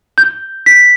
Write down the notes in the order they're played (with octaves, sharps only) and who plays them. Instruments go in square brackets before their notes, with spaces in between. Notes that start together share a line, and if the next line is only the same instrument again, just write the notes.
[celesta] G6
B6